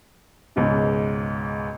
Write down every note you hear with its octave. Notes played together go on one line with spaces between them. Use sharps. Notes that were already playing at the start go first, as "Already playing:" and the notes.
C#2 G#2 B2